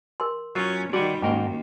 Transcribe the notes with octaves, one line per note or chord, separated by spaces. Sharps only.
A#4 C6
F#3 C#4 F4
D#3 G3 F#4 D5 F#5 G#5 D6
D#2 G#2 C#4 A#4 G5